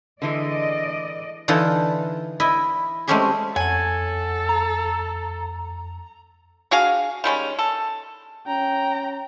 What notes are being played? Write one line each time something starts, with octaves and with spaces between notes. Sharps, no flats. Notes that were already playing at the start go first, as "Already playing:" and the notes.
D3 E3 G#3 D5 D#5
D3 E3 D#4 F4 A4
E4 D#5
G#3 A3 C4 C#4 G4 G#4
F2 A4 C#5 F#5 G#5
A#5
D4 F#4 G#4 F5
D#3 G3 G#3 C#4
A4
C#4 G5 A#5